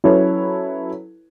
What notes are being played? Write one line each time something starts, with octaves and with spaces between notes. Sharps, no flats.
F#3 C#4 E4 A4 B4 C#5